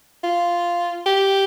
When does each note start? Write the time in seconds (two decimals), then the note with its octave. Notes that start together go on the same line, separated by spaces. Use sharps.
0.24 F4
1.06 G4